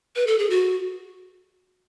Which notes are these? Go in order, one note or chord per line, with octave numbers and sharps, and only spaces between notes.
B4
A4
G#4
F#4